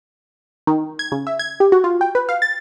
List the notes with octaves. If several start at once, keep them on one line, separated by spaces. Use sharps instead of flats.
D#3
G#6
C#3
E5
G#6
G4
F#4
F4
G5
B4
F5
A6